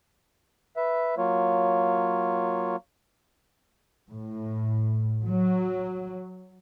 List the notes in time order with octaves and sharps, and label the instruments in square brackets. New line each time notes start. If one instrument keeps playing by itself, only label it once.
[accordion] B4 E5
F#3 A#3 F4 C#5
[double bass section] A2
F#3